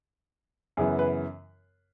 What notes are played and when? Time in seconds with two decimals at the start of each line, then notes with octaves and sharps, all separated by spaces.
0.77 F#2 C#3 E3 B3 G#4
0.99 B4